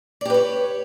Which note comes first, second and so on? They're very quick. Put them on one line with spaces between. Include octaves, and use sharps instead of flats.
D5 G4 B4 C#5